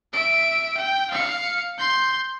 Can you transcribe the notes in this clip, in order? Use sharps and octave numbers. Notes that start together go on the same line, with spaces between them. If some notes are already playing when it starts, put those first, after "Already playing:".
E5 D7
G5
F5 C#7
C6 G6